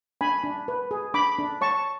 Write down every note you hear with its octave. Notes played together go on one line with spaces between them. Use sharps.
D4 G#5 B5
D4
B4
G#4
D4 B5 D6
D4
C#5 A5 C#6